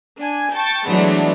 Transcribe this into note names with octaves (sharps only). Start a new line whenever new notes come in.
D4 G#5
G5 A5 C#6 A6
E3 F#3 G#3 A3 B3 D4